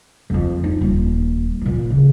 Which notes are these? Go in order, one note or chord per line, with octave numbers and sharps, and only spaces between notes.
F2 F4
D#4
D#1
A#2 E3
C#3